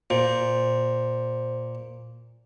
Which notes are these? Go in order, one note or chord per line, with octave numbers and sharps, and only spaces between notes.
A#2 C5